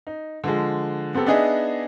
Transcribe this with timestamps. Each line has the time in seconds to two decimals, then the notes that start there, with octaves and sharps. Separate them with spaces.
0.07 D#4
0.44 D3 F3 G#3
1.15 B3 C4 G4 A4
1.26 B3 D4 D#4 G#4 D#5 E5